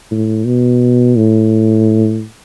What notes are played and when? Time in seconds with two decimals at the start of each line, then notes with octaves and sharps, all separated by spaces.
0.11 A2
0.46 B2
1.16 A2